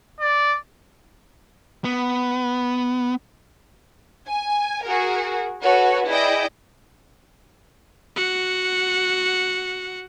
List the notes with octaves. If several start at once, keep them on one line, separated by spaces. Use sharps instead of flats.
D5
B3
G#5
F#4 G#4 A#4
F#4 A4 B4 C#5
E4 G#4 D5 D#5 G5
F#4 F#5